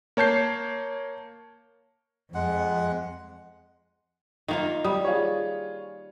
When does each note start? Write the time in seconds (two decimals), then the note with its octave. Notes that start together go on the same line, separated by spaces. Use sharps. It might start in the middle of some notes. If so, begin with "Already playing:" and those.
0.17 A#3 C#5 A5 G6 C7
2.35 F2 G#3 F#5
4.48 D#3 A#3 F4
4.84 G3 D#6
5.05 F4 G#4 C#5